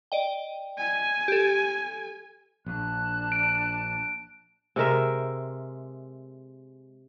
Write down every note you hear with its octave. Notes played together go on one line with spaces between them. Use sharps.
D5 D#5 G5
G#5
G4 A4
A#1 D4 A5 F#6
D7
C3 G#3 A#4 E5